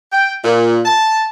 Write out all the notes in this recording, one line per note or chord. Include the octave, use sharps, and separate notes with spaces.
G5
A#2
A5